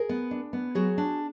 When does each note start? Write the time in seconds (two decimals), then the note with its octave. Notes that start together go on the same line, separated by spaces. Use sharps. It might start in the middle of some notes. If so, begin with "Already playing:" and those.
Already playing: G#4 A#4
0.09 B3
0.31 D4
0.53 B3
0.75 F#3 F#4 G#4
0.98 D4